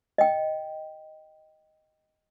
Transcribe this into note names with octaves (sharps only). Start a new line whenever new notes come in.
D#5 G5